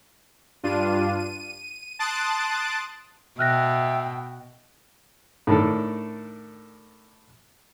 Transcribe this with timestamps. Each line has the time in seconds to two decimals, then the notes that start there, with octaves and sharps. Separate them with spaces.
0.63 G2 D4 F4 D#7
1.19 D#7
1.99 A5 C6 D#6 F#6 A6 D7
3.39 B2 E5 G5 F6 F#6 A#6
5.47 A2 D#3 D4 A4